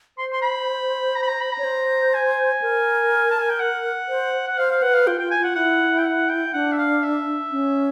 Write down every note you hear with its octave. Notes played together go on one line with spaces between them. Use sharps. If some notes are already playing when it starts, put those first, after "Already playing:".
C5 C6
C6
B5
A#5
B5
A#5
B5
A#5
C#5
C5
G#5
A#4
A5
G#5
G5
F#5
C5
F#5
C5 F5
F5
B4 F#5
F5
F4 G5
F4 G5
G#5
F4 F#5
E4 F#5
G5
F#5
G5
D4 F#5
E5
F5
E5
C#4